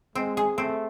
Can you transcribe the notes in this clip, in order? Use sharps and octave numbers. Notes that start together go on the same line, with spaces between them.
G#3 C4
G#4
A3 C4